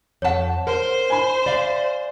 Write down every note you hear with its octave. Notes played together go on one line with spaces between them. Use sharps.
F2 C#5 F#5 A5
A#4 C5
G#5 B5
D5 E5 F5